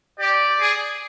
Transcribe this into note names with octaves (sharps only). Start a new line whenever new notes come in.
G4 D5
G#4